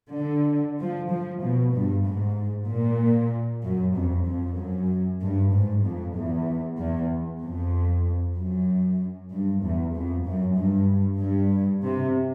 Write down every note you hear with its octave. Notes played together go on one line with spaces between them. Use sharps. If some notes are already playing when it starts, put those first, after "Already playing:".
D3
F3
F3
B2
G2
G#2
A#2
F#2
F2
F2
F#2
G2
G#2
F2
E2
E2
F2
F#2
G2
E2
F2
F#2
G2
G2
C3